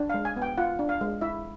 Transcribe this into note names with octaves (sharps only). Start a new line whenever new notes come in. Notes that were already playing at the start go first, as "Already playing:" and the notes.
Already playing: D4
G#3 F5
G#5
B3
G5
F4 F#5
D4
F5
G#3
E4 E5